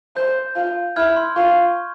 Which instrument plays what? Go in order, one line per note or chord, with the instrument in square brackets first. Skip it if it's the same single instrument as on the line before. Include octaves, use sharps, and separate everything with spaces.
[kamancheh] C5 [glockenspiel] G6
[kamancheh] F4
[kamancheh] E4 [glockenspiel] F6 G#6
[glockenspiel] C6
[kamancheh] F4 [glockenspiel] C#6